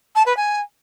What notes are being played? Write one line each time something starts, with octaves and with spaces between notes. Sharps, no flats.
A5
B4
G#5